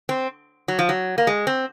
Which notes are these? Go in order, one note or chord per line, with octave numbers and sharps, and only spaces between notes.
C4
F#3
F3
F#3
A#3
G#3
C4